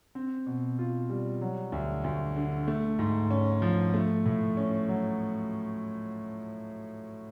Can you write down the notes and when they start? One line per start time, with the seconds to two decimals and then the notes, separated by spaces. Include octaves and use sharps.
0.15 C4
0.46 B2
0.79 F4
1.10 G3
1.41 F#3
1.72 D2
2.04 D2
2.36 D3
2.68 A3
2.99 G#2
3.31 C#4
3.62 F3
3.94 A3
4.26 A2
4.57 C#4
4.89 F#3